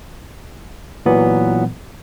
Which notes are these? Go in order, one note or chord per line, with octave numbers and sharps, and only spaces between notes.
A#2 E3 F#3 B3